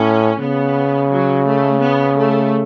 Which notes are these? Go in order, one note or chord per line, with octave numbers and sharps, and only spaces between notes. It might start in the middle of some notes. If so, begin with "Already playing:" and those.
Already playing: A2 C#4
C#3 B3
F#3
A3
B3
A3